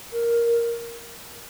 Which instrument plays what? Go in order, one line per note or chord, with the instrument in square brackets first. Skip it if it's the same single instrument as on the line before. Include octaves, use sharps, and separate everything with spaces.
[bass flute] A#4